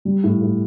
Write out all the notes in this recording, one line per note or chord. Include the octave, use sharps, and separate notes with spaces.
G3
A2
A2